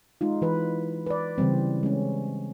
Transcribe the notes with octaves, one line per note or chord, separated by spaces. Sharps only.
G#3 D#4 F4
E3 B4
B4 D5
C#3 E3 G3 C4
G#3 C#4